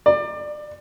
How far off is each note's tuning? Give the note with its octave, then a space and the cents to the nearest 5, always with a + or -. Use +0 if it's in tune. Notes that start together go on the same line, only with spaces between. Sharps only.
D5 +25